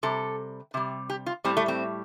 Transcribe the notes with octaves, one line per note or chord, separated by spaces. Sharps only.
C3 G3 A4
C3 G3
G4
F4
A2 G3 C4
A3
C4